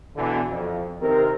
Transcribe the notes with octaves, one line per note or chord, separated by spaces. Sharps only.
B2 D3 E3
F2
C3 D#3 C4 A#4